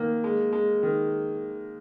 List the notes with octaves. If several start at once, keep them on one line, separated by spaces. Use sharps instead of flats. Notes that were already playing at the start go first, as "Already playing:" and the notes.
Already playing: D#3 A#3
G#3
G#3
D#3